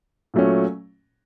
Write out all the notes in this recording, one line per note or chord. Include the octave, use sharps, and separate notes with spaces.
A#2 F#3 A3 C#4